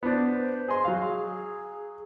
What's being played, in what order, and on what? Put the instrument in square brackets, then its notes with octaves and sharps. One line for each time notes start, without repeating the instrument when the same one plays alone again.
[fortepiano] B3 D4 [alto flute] C5
[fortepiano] G#4 D#5 C6
F#3 F5
[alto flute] G#4